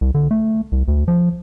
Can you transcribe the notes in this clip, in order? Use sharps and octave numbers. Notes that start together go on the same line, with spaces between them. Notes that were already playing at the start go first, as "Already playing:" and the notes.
C2
D3
A3
C2
D2
F3